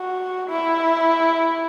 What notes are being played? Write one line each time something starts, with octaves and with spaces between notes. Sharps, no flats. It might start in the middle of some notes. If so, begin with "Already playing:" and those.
Already playing: F#4
E4